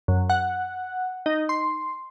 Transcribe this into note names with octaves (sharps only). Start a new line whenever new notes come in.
F#2
F#5
D#4
C6